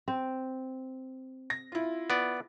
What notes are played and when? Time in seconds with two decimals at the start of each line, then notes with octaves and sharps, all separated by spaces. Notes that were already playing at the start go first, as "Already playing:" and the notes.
0.08 C4
1.50 A#6
1.72 E4 F4
2.10 B3 D5